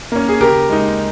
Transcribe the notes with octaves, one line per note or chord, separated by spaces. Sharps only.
A#3 C#4
G#4
C#3 G4 A#4
G#3 D#4